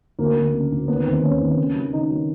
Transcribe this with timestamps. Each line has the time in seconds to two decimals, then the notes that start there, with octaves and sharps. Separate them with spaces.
0.19 D2 A#3
0.36 D2
0.54 C#3
0.72 D2
0.88 D#3 B3
1.06 D#2 C4
1.23 D#2 C#4
1.41 D#2
1.58 C#3
1.75 F#3
1.93 C#3 D#4
2.10 F#3